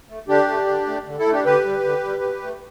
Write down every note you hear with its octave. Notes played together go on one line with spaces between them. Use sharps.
A3
D3 D4 G4
A3
D3
A3
D3
E4 A4
A3
D4 G4
D3 G4 B4
G3
D3
G3
B2
A3